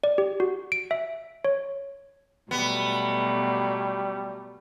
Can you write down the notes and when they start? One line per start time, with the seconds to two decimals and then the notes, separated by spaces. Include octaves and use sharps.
0.04 D5
0.18 G4
0.40 F#4
0.72 D7
0.91 E5
1.45 C#5
2.51 B2 F#3 G3 A3 B3